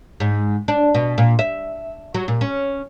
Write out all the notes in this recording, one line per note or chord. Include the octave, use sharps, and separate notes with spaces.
G#2
D4
B2
A#2
E5
F#3
A#2
C#4